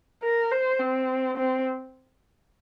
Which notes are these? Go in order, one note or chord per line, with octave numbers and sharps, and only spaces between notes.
A#4
C5
C4
C4